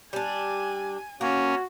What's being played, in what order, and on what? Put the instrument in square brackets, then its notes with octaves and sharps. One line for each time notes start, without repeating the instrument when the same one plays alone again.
[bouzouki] G3 D4 [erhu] G#5
[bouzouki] A#3 [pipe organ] C#4 [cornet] F#4